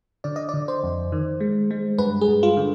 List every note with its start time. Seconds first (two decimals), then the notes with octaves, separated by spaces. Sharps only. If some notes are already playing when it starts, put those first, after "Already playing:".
0.24 D3 D5
0.36 D#5
0.49 D3 D5
0.68 C5
0.83 F2
1.12 D#3
1.40 G#3
1.71 G#3
1.98 G2 B4
2.21 G#4
2.28 G2
2.43 F4
2.57 D3